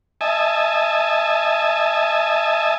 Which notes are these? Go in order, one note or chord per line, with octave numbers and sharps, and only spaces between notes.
D#5 E5 G#5 A5